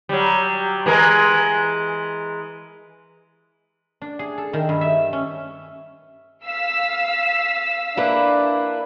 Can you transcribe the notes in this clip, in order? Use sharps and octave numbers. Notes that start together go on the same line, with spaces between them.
F#3 G3
E3 G#3 A#4
D4
G#4
A4
D#3
G2
E5
C#4
F5 E6 B6
A#3 D4 E4 B4